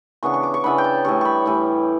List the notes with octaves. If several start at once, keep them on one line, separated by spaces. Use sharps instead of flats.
C#3 E3 B3 D4 C#6
C#6
D6
C#6
C#3 E3 B3 D4 B5
G5
A5
A2 E3 G3 C#6
B5 C#6
A2 E3 G3